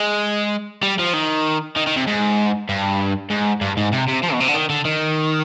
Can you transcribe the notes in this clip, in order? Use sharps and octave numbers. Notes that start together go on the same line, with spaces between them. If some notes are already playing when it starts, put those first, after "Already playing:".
Already playing: G#3
G3
F3
D#3
D#3
D#3
C3
G#2
G2
G#2
G2
G#2
C3
C3
F3
B2
C3
D3
D#3
D3
D#3